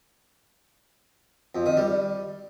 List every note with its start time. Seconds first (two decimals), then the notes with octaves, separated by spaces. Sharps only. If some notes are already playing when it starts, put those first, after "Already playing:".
1.55 F2
1.66 D#3
1.77 G3